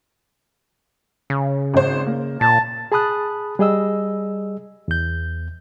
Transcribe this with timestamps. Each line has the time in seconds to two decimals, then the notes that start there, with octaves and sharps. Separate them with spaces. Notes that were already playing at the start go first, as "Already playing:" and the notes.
1.30 C#3
1.74 G#1 C5
2.06 A#3
2.41 A#2 A5
2.92 G#4 A5 B5 D#6 F#6
3.59 G3 G#4 D#5 E6
4.88 E2 G6